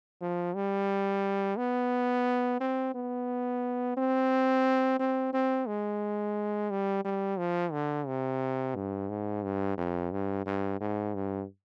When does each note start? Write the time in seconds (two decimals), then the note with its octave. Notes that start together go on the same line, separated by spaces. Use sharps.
0.21 F3
0.55 G3
1.58 B3
2.60 C4
2.95 B3
3.97 C4
5.00 C4
5.34 C4
5.67 G#3
6.71 G3
7.05 G3
7.39 F3
7.72 D3
8.07 C3
8.75 G2
9.09 G#2
9.43 G2
9.78 F2
10.12 G2
10.46 G2
10.81 G#2
11.15 G2